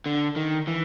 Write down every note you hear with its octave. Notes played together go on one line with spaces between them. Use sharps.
D3
D#3
E3